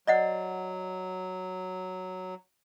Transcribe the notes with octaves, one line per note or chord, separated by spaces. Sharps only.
F#3 D5 D#5 F#5